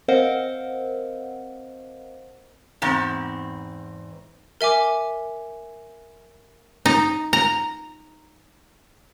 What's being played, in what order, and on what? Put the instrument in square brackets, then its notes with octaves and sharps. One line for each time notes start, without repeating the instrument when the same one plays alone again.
[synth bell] C4 A#4 C5 D#5 F5 F#5
[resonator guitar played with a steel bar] E2 G#2 C4
[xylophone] A#4 E5 G#5 D6
[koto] D#4
A#5